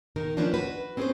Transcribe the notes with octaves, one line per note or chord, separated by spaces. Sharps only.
B2 D#3 D#4 A#4
D#3 F3 A#3 C#4 D4 B4
F#4 B4
C4 C#4 G#4 A4 B4 C5